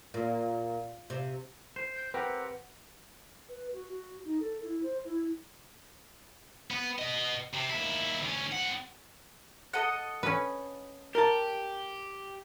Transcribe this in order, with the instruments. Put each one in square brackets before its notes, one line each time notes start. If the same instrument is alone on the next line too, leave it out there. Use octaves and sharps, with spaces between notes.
[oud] A#2
C3
[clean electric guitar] C5
[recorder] G6
[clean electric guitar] C4 G4 A#4 [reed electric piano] B4 [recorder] F#5
[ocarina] B4
F#4
F#4
D#4
A4
E4
C5
E4
[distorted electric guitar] B3
B3 D#5
C3
D#2 E4
D2 C#4
C4 F#5
[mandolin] A4 D#5 F#5
[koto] C#4 B4
[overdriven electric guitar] G4 [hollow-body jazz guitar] A#4 A5